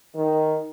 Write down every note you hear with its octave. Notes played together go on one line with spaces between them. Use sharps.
D#3